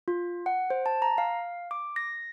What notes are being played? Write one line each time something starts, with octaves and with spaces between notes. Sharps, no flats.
F4
F#5
C5
A5
A#5
F5
D6
A#6